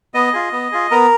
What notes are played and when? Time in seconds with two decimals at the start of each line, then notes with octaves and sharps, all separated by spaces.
0.14 B3 D#5
0.33 F4 G#4
0.53 B3
0.72 F4 G#4
0.91 B3 A#4